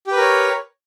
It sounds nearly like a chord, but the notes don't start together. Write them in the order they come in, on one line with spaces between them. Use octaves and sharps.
G4 B4 A#4 C#5